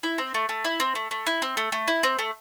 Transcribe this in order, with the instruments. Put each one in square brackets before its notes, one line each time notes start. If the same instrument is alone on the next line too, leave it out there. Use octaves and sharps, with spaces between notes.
[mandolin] E4
C4
A3
A3
E4
C4
A3
A3
E4
C4
A3
A3
E4
C4
A3